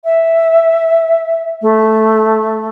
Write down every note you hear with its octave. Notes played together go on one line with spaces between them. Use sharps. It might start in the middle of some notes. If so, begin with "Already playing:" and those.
E5
A3